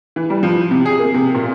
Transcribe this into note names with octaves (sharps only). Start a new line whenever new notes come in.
E3
G3
F3
C3
G#4
A#3
C3
A#2